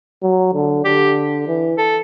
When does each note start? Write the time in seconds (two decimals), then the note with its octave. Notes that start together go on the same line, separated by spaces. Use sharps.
0.23 F#3
0.54 D3
0.85 D3 G4
1.48 E3
1.78 A4